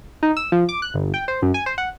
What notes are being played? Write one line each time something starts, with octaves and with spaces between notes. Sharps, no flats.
D#4
E6
F3
D6
F#6
G1
G5
C5
F#2
G#5
C5
F#5